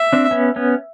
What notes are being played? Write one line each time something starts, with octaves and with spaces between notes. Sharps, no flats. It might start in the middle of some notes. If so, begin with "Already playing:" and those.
Already playing: E5
C4 D4
B3 C#4
B3 C#4